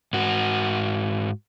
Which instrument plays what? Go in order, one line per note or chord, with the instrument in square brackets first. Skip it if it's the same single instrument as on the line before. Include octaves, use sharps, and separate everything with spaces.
[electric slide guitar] G#2 F#4